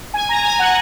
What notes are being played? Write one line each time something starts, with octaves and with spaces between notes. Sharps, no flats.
G#5
A#5
G#5
F#5